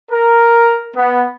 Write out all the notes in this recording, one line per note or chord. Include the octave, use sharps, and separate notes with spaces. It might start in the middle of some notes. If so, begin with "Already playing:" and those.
A#4
B3